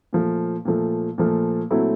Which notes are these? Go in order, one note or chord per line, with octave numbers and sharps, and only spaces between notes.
A#2 F3 A3
A#2 F3 A3
A#2 F3 A3
A#2 F#3 A3 C4 E4